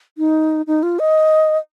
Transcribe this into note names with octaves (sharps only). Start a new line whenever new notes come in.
D#4
D#4
F4
D#5